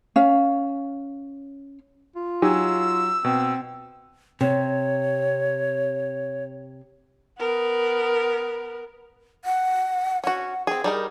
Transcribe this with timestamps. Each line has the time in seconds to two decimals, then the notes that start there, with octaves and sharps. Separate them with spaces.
0.16 C#4 F5
2.16 F4
2.42 F#3 D#4 G4 G#5 E6
3.24 B2 C4
4.41 C3 C#5
7.39 B3 A#4
9.45 F#5
10.24 C#4 F#4 F#5
10.67 C4 G#4 G5
10.84 G3 D#4 G#4 A#4